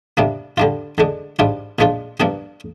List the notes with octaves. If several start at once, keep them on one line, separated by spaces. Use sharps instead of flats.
C3 G3 A#3 D4
D3 G3 D4 F4
D3 G#3 D4
G#2 G3 D4 F4
A#2 F3 G#3 D4 F4
G2 F3 A#3 D4 G4